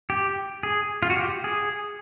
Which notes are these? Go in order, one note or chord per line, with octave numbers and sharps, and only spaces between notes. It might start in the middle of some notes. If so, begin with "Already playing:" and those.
G4
G#4
F4
F#4
G4
G#4